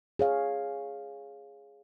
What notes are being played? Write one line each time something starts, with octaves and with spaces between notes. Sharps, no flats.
G#4 C#5 F5